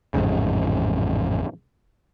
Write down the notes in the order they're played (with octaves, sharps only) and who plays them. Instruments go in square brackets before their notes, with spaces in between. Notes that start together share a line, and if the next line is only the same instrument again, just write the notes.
[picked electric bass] A1 F2 G#2 C#3